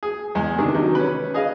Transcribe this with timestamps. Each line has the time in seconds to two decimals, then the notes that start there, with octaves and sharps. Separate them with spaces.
0.03 G#4
0.35 E2 G#3
0.58 C3 D#3 D4
0.75 D#3 F#3
0.95 C#4 B4
1.34 G#4 D#5 F5